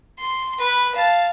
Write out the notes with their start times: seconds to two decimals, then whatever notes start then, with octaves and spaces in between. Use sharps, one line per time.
0.19 C6
0.58 B4 B5
0.95 F5 A5